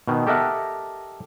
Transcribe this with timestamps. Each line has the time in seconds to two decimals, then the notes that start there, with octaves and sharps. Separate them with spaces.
0.08 B2 D#3
0.27 G4 A4 A#4 D#5 E5 F#5